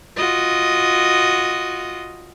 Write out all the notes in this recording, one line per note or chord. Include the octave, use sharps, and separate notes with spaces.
F4 F#4 D#5